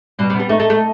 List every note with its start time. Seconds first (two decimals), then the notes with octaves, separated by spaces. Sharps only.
0.19 B2 G3
0.30 C3
0.34 B3
0.40 G3
0.49 A3 D#4
0.60 A3
0.70 A3